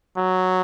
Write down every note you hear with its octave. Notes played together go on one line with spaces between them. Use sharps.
F#3